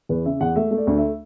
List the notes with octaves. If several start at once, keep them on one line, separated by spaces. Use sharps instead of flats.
E2 B4
C#3 E5
E2 F#5
A3 E5
A3
D5
D2
E5